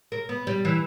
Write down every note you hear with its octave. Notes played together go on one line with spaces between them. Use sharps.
A#4
B3
G3
E3